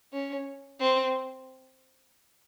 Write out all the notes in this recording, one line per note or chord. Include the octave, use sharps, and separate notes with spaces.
C#4
C4